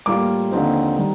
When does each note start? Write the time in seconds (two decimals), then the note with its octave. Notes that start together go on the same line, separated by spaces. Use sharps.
0.06 A2 G3 A#3 F4 D6
0.51 D#2 D3 F3 C4 D#4
0.96 D#3 G3